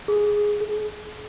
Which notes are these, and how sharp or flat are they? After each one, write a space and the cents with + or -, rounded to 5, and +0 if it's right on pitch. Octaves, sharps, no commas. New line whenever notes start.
G#4 +0
G#4 +40